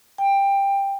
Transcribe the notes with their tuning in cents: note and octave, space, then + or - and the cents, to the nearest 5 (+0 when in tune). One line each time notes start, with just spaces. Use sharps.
G5 +15